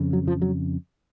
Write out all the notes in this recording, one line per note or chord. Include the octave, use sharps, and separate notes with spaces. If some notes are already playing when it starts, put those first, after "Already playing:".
Already playing: F2 C#3
F#3
F3
F#3